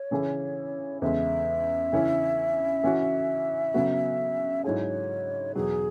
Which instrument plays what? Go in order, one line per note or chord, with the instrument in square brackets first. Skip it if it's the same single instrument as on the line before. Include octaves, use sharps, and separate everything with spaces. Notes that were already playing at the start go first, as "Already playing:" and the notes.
Already playing: [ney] C#5
[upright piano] C#3 E3 C#4 E4 G#4
[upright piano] E2 C#3 G#3 [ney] E5
[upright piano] C#3 E3 C#4 E4
E3 C#4 F#4
C#3 F#3 B3 F#4
[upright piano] G#2 F#3 E4 G#4 [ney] C#5
[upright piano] E2 B2 F#3 [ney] G#4